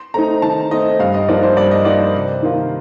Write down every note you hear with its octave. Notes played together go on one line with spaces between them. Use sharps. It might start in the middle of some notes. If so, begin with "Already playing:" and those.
Already playing: C6
A3 C4 D#4 A#5
D#3 A5
A3 C4 D#4 D#5
G2 F5
D#5
F3 A#3 D#4 D5
C5
G2 D5
D#5
F3 A#3 D#4 D5
C5
C3
D#3 A#3 F4